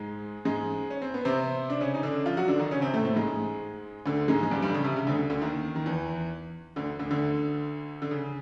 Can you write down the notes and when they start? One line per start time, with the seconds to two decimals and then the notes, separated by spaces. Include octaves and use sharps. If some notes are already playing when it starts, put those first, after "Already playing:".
Already playing: G#2 G#3
0.45 G#2 G#3
0.90 C#4
1.02 C4
1.14 B3
1.25 C3 C4
1.70 D4
1.80 C#3 C#4
1.94 D#4
2.03 D3 D4
2.26 F3 F4
2.37 F#3 F#4
2.48 D3 D4
2.59 D#3 D#4
2.71 C#3 C#4
2.82 C3 C4
2.94 A2 A3
3.05 A2 A3
3.16 G#2 G#3
4.06 D2 D3
4.28 G#2 G#3
4.43 G#3
4.51 G2 G3
4.62 G2 G3
4.68 D3
4.74 C#3
4.84 C3
4.96 C#3
5.07 D2 D3
5.30 D2 D3
5.42 D#2 D#3
5.76 D#3
5.86 E2 E3
6.76 D2 D3
6.99 D2 D3
7.11 D2 D3
8.02 D3
8.11 C#3